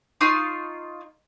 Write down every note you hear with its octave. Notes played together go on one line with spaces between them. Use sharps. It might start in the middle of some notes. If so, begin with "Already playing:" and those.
D#4 F4 C6 C#6